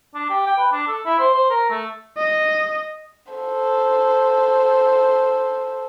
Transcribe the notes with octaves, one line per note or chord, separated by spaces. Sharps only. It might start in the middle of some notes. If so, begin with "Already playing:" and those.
D4
G4
G5
B4
D4
A4
E4
C5
C5
A#4
A3
D#5
A4 C5